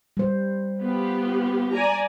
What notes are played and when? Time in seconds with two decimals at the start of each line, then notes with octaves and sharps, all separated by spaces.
0.17 G3 C5
0.80 B3 F4 G4
1.72 D5 G#5 A#5